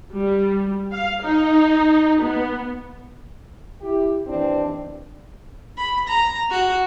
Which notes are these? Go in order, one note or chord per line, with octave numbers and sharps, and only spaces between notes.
G3
F5
D#4
B3
E4 G4
D#2 E3 C4 D4
B5
A#5
F#4